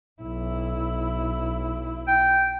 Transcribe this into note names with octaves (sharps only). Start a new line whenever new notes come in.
B1 E4
G5